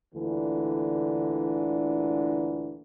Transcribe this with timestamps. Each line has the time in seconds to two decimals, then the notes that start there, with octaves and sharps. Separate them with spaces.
0.15 D2 A#2 D3 E3